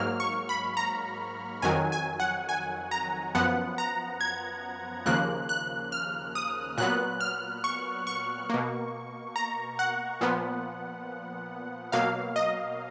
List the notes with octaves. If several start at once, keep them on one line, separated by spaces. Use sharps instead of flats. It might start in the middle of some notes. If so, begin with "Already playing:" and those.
Already playing: G#2 F#3 A#3 F6
C#6
B5
A#5
F2 D#3 F#3 G#5
G#5
F#5
G#5
A#5
F#2 F3 B3 F#5
A#5
G#6
D#2 C#3 F3 A#3 F#6
F#6
F6
D#6
A#2 F#3 B3 F#6
F6
C#6
C#6
B2 A#3
A#5
F#5
A#2 F3 B3
B2 F#3 A#3 F5
D#5